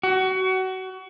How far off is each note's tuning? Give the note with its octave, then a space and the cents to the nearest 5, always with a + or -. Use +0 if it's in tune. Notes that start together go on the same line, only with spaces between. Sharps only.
F#4 +25